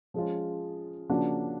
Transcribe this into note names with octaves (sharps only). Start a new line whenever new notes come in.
F3 G#3 C#4 F4
C#3 F3 A#3 D4 F#4